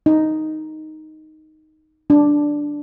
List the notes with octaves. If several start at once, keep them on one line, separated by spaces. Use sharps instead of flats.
D#4
D4